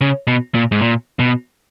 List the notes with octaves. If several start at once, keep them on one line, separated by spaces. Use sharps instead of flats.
C#3
B2
A#2
G#2
A#2
B2